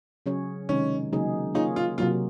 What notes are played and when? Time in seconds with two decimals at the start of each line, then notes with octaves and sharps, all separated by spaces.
0.26 C#3 F#3 C#4 G#4 C#5
0.69 C3 D#3 G#3 C#4 D#4
1.13 C#3 F#3 A#3 D#4 G#4
1.55 A#3 D#4 F4 G#4 C#5
1.76 F4
1.98 C3 F#3 A#3 F4